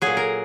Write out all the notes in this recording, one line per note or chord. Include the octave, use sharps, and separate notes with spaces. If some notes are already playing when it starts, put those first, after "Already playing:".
A#2 F#3 G#4
A#4